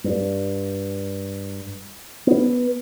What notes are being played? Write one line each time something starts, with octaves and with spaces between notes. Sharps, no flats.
G2
B3